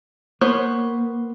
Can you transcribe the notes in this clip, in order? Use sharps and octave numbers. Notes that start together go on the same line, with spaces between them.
A#3 B3 C5 C#5